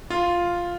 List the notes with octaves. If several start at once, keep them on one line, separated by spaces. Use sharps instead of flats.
F4